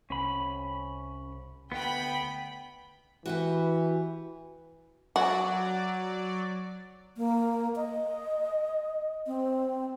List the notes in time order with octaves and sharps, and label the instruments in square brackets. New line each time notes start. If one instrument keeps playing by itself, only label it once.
[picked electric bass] C2 [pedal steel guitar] C#4 B5
[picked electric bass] D2 [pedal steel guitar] B3 [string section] G5 B5
[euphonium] E3 [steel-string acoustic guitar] F#4 G4 B4
[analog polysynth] F#3 D5 [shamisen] F#4
[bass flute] A#3
D#5
C4